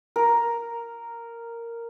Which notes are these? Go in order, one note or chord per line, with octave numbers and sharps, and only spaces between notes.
A#4